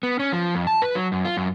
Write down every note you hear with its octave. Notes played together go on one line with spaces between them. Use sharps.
B3
C#4
F3
F2
A5
B4
F#3
F#2
F4
F#2